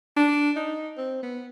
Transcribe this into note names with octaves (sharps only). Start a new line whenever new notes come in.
D4
D#4
C4
B3